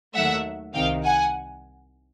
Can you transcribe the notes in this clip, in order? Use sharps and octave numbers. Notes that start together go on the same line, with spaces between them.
D#2 D#3 F#3 A3 E5 F#5
C2 C3 D#3 F5 G5
F#5 G#5